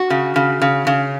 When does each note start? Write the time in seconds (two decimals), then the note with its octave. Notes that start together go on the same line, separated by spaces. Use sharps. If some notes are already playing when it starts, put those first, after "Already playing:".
Already playing: F#4
0.10 C#3
0.36 C#3
0.62 C#3
0.87 C#3